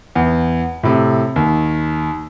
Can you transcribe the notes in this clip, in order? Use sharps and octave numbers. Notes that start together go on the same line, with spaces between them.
E2
A2 C3
D#2